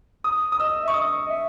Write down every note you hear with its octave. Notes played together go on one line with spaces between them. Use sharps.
D#6
D#6
D#5 E6
E5
C#6
D#5 D#6
E5